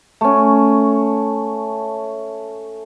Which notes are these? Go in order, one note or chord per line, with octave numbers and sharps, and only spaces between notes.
A3 C#4